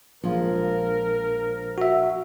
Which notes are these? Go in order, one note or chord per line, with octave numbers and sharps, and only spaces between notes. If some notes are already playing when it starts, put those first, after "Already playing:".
A#1 F3 G#3 F4 A#4
F#4 E5